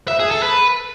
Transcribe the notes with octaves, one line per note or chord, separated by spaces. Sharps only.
E5
G#4
A4
B4